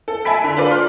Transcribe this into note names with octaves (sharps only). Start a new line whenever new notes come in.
A4
E5 G#5 A5 B5 B6 D7
D3 B6
D4 F4 A4 B4 D5
C6 F6